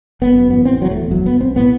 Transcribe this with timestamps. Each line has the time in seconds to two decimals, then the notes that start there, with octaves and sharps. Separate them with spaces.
0.21 G1 B3
0.36 F#2
0.50 A1 B3
0.65 A2 C4
0.81 E1 F#3
0.91 A3
0.96 E2
1.11 G1 F#3
1.26 G2 B3
1.41 B1 C4
1.56 A2 B3